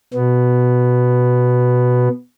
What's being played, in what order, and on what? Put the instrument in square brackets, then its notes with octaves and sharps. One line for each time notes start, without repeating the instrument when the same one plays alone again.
[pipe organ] B2 B3